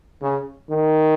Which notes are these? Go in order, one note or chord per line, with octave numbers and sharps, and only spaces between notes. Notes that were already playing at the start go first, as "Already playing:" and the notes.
C#3
D#3